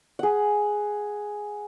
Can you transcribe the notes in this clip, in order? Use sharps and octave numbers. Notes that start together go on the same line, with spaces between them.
G#4 F#5